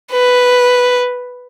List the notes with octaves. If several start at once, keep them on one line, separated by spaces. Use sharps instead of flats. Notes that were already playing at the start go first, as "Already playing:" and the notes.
B4